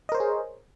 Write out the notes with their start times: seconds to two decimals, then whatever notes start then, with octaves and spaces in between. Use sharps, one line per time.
0.09 D#5
0.12 A#4
0.15 C5
0.17 C#5
0.20 G#4